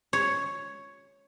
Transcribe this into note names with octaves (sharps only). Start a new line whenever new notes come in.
C#5